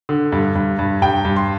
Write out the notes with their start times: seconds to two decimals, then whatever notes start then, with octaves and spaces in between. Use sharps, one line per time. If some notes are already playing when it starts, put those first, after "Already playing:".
0.09 D3
0.32 G2
0.55 G2
0.79 G2
1.01 G2 G5
1.25 G2
1.36 C6